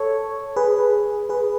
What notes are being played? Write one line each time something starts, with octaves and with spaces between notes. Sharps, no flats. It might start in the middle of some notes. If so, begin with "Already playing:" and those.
Already playing: A4 C#5
G#4 B4
G#4 B4